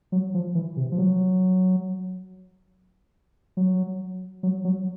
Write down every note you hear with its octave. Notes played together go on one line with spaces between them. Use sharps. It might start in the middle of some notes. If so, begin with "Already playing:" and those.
F#3
F3
E3
C3
F3
F#3
F#3
F#3
F#3